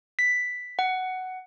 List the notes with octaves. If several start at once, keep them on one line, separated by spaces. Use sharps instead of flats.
B6
F#5